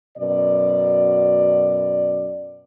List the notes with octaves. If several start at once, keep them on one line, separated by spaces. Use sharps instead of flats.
F#2 B2 D5